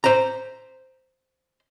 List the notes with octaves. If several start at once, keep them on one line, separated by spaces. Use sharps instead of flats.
C5 A#5